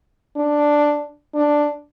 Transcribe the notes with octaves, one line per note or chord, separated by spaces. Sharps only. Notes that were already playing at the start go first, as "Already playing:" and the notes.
D4
D4